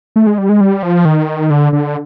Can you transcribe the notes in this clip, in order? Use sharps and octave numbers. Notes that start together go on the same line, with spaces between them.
A3
G#3
G3
G#3
G3
F3
D#3
D3
D3